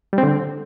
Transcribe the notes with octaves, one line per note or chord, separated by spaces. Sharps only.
G3
C4
D3